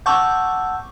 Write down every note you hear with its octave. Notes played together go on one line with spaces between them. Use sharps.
F#5 A5 C#6 D6 E6 G6